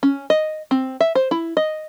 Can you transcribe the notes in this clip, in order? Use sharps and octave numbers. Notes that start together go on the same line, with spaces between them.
C#4
D#5
C4
E5
C5
E4
D#5